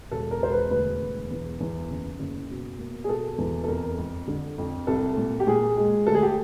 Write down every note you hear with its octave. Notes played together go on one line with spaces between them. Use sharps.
E1 A4
A#4
E1 C5
B4
D2 B4
E1
E2
E2
F#1
F#1
B2
A#3
G#4
B2 A4
E2
A4
F2 A#4
F2
D3
F2
C2 A4
A#2
G4
A#2 G#4
G#3
D2 A4
G#4
G4